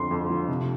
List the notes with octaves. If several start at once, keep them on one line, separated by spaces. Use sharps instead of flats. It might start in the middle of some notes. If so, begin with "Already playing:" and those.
Already playing: F2 D3 C6
F2
F3
C3